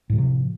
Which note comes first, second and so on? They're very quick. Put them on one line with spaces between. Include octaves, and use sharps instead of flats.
A2 F#3 C3 F3